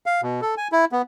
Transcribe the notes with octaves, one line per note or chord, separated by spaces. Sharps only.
F5
B2
A4
G#5
E4
B3